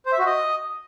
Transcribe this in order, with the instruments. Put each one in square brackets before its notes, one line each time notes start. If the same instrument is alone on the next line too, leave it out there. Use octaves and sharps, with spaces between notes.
[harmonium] C5
E5
F#4
D#5